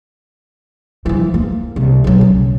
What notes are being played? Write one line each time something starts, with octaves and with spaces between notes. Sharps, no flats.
E3 F3
A#3
C2
B1 F#3
C#3